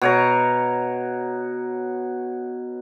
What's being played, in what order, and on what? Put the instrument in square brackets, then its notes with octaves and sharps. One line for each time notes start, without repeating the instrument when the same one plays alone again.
[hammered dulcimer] B2 C#5 A#5